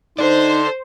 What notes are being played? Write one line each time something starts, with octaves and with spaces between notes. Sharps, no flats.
D#4 A4 C5 D5